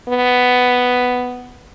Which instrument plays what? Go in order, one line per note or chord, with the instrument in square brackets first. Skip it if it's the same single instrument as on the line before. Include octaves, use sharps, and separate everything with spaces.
[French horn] B3